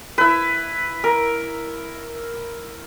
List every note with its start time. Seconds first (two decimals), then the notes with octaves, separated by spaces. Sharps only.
0.18 E4 B4
1.04 A#4